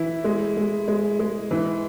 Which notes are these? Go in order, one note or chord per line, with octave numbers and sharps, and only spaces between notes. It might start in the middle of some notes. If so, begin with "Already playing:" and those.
Already playing: E3 E4
G#3
G#3
G#3
G#3
E3